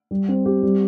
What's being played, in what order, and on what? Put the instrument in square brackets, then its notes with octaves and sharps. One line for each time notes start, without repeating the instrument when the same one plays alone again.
[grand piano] G3
C4
G4
G3